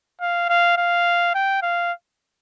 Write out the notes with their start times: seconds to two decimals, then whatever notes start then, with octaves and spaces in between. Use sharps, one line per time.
0.21 F5
0.49 F5
0.77 F5
1.35 G5
1.62 F5